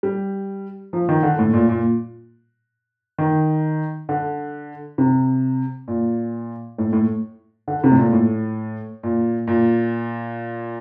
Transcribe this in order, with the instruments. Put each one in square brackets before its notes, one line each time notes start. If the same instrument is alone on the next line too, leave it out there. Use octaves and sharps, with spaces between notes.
[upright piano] G3
F3
D#3
D3
A2
A#2
A#2
D#3
D3
C3
A#2
A2
A2
D3
C3
A2
A#2
A2
A#2
A#2